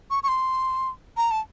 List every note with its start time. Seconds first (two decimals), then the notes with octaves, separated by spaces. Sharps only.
0.11 C#6
0.23 C#6
0.28 C6
1.17 A#5
1.31 A5